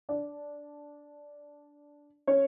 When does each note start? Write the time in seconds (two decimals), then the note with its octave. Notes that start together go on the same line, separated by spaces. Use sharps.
0.09 D4 D5
2.27 C#4 C#5